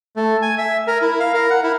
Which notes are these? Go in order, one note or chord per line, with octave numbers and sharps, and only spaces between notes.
A3
G#5
E5
A#4
E4
F5
A#4
F#5
E4